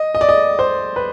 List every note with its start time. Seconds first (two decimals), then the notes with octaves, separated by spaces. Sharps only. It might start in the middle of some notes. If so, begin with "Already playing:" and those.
Already playing: D#5
0.15 D#5
0.21 D5
0.29 D#5
0.59 C5
0.96 B4